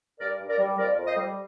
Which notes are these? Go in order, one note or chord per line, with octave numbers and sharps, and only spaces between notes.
G2 A#4 D5
G2
A#4 D5
G3
F2 A#4 D5
F2
C5 D#5
G3